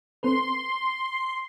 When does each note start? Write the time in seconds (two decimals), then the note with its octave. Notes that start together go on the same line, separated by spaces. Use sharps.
0.23 C4 A4 B4 C6